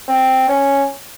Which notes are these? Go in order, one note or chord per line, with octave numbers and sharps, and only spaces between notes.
C4
C#4